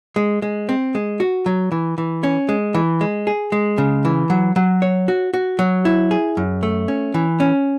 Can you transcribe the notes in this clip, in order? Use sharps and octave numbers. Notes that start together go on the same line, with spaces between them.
G#3
G#3
C4
G#3
F#4
F#3
E3
E3
C#4
G#3
E3
G#3
G#4
G#3
C#3
E3
F#3
F#3
C#5
F#4
F#4
F#3
E4
G#4
F#2
A3
C#4
E3
C#4